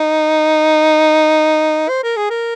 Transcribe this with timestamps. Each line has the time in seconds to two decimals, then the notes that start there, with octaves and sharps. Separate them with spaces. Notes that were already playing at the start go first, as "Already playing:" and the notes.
Already playing: D#4
1.89 C5
2.03 A#4
2.16 G#4
2.30 A#4